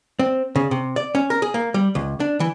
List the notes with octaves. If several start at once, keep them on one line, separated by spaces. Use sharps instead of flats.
C4
C#3
C3
D5
C#4
A#4
G#4
A#3
G3
C#2
D4
E3